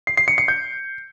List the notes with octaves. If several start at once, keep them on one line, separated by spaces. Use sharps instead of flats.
C7
C7
C#7
C#7
G6